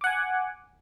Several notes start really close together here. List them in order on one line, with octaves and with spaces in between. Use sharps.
D6 F#5 G#5